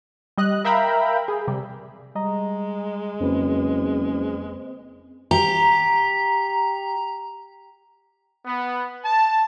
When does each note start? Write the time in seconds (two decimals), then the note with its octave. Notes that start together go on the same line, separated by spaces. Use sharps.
0.38 G3 D#5 F#6
0.65 A#4 E5 F5 G5 A#5 B5
1.28 G#4
1.47 C3 G3
2.15 G3 G#3 D#5 A#5
3.20 F#1 F2 C4 G#4 B4
5.31 G4 A#5
8.44 B3
9.04 A5